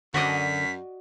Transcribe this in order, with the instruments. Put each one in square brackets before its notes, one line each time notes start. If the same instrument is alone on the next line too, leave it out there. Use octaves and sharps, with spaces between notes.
[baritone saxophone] F#2 [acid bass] D3 [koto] F#4 D5 D#5 [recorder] B6